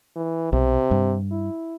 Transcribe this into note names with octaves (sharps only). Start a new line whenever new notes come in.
E3
B1 C3
G2
E4